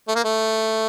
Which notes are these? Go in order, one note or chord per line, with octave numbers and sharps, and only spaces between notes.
A3
A#3
A3